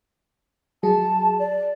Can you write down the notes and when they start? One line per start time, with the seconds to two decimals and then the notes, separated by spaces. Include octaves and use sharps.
0.83 F#3 G#4 A5
1.39 D5